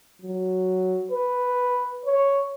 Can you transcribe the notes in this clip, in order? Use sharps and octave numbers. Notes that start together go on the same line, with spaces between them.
F#3
B4
C#5